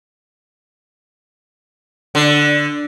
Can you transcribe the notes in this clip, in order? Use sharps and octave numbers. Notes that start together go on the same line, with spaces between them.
D3